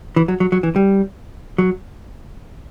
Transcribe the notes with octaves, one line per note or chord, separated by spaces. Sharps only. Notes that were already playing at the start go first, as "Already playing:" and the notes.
E3
F#3
F#3
F#3
E3
G3
F#3